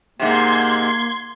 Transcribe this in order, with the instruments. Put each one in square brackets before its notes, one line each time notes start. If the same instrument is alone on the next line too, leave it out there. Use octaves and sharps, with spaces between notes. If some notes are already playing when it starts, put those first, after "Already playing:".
[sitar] G#2 C3 [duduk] A#3 [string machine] C6 G#6